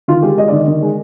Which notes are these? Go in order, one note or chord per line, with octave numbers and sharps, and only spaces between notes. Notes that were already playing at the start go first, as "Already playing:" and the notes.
D#3 F4
G#3 G4
G#3 D#5
D#3 D5
D#5
D#3
G#3